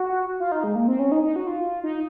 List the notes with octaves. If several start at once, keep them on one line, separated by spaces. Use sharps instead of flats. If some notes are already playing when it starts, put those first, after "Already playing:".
Already playing: F#4
F4
D#4
G#3
A#3
C4
C#4
D#4
D#4
F#4
F4
D#4